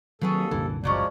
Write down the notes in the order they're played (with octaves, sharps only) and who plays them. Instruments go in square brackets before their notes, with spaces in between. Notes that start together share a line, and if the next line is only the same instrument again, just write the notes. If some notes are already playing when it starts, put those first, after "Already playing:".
[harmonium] D#2 A4 [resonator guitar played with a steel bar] B2 B3 G#4 [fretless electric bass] D#3 F#3 C4
[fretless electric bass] C2 F#2 A#2 [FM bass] D3 [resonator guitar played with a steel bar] E3
[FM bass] F#1 [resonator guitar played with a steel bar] B2 F#3 C#4 [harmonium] F3 G#3 D5